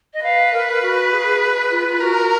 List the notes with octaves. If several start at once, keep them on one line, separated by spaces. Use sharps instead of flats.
D#5
B4 F5
A#4
F#4
G#4
F4
F4
F#4 A#4